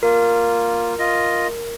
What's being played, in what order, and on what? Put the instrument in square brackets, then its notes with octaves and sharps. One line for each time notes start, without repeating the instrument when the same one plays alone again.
[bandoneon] A#3 F4 [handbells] A#4
[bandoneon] F4 D#5